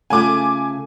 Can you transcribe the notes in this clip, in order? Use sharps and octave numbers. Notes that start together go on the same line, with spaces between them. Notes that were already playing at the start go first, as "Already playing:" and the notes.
C#3 A3 F4 G#5 D6